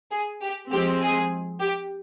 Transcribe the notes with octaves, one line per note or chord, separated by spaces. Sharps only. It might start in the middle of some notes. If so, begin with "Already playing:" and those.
G#4
G4
F3 G#3 C4 G4
G#4
G4